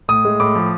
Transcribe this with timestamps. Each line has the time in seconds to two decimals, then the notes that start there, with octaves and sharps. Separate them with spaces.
0.08 A2 D#6
0.25 G#3
0.40 A2 D6
0.55 F3